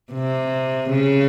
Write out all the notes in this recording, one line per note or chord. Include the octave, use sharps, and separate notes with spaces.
C3
C#3